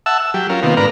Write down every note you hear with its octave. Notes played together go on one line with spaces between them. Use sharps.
E5 F#5 A5 E6
E6
F#3 G4
C#4 F4 A#4
C3 D#3 A#3 B3 F4
G#2 D4 A#4 B4 A#5 F6